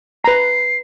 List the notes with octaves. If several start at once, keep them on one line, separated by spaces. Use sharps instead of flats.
B4 A#5 C7